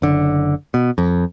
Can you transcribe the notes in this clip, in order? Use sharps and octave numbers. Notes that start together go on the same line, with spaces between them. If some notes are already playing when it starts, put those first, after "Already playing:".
F#1 D3
B2
F2